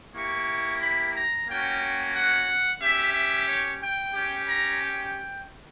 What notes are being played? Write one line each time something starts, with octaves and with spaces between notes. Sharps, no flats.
A#3 E4 G4 C#6
B5
A#5
A#3 C#4 F#4 G5
F#5
C#4 G4 E5
E5
C#5
G5
C#4 G4
A#5
G5